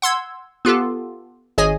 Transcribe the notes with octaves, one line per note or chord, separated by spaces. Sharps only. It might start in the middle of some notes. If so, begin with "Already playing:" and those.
F#5 C6 E6 G#6
B3 F4 G4 A4
G#1 G#4 C#5 D#5 G#5